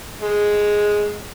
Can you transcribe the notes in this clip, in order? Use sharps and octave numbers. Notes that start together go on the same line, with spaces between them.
G#3